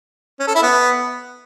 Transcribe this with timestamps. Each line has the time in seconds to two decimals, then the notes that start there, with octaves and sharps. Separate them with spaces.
0.40 C#4
0.47 A4
0.55 E4
0.63 B3